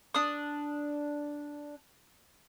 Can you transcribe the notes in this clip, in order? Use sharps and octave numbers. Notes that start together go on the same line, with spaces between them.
D4 D#6